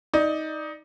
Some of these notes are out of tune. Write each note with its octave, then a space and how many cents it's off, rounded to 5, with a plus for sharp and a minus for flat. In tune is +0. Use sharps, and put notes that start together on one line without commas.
D#4 +15 D5 +25